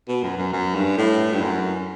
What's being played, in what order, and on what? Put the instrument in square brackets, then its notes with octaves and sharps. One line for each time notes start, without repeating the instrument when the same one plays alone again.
[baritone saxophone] B2
F#2
F#2
F#2
G2
A2
G2
F#2